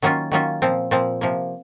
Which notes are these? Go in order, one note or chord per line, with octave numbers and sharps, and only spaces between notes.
D#3 F#3 A#3 C#4 F4
D#3 F#3 A#3 C#4 F4
A#2 F3 C4
A#2 F3 C4
C3 F3 A#3